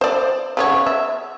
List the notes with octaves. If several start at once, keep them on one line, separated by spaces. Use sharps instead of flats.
C5 D5
C#3 B3 C#5
E5